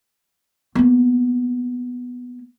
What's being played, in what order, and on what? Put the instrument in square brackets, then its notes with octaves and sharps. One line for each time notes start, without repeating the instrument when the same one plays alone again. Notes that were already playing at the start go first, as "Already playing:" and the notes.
[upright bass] A#3 B3